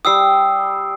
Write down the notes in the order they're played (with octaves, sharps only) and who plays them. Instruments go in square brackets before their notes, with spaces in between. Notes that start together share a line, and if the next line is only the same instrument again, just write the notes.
[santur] G3 G5 [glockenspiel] D#6 E6 C7